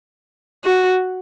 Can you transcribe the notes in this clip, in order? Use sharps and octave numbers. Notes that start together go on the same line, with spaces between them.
F#4